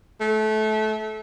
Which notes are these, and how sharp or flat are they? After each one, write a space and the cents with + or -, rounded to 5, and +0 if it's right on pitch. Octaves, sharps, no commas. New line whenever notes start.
A3 -25